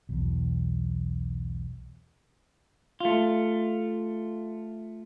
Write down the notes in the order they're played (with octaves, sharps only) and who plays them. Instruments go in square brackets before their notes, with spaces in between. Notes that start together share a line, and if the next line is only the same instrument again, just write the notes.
[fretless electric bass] B1 E2
[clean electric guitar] A3 F4